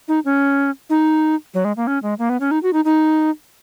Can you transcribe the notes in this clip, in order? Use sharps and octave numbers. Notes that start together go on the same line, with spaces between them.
D#4
C#4
D#4
F#3
G#3
A#3
C#4
G#3
A#3
B3
C#4
D#4
F#4
D#4
D#4